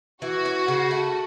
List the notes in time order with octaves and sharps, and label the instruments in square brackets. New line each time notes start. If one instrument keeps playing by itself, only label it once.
[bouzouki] E3 [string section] F#4
[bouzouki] C#4
C#3
A3